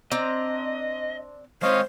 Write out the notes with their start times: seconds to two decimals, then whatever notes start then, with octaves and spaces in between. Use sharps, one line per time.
0.12 C4 D4 D#5 A#5
1.63 G#3 C4 C5 C#5 D#5 F5